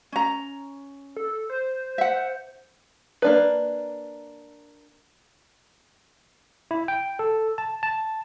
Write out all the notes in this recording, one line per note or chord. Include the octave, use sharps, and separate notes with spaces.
C#4 A#5
A4
C5
E5 F#5
A#3 D4 B4
E4
G5
A4
A5
A5